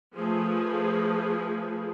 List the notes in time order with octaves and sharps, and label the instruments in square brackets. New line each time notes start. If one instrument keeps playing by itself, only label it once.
[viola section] F3 A3 G#4 B4